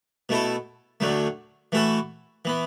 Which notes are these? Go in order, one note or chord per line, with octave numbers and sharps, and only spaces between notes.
B2 A3 E4 A4
D2 D3 F#3 A3
E3 A3 F#4 A4
E3 B3